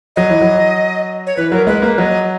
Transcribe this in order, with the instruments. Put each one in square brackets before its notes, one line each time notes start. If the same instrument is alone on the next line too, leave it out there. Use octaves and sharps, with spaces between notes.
[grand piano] F#3 [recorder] D#5
[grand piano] E3
F#3
[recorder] C#5
[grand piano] E3 [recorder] B4
[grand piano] F#3 [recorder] A#4
[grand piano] G#3 [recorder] B4
[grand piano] A#3 [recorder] B4
[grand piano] F#3 [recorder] D#5